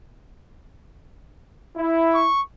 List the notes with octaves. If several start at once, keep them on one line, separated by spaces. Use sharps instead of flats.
E4
C#6